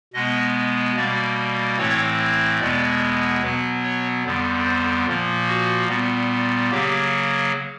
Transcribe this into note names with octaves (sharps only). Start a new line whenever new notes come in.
B2 G#3 B3 D#5
B2 G3 A#3 D5
A2 E3 A3 C4 C#5
E2 B2 G#3 B3 D5
B2 F#3 B3 B4
C#5
F2 D3 G3 B3
C5
A#2 F3 A#3
F#4
A#2 G3 B3
C#3 F#3 A#3 G4